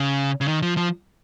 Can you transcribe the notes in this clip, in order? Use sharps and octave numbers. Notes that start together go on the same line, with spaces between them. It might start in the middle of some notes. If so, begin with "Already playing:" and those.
Already playing: C#3
C#3
D#3
F3
F3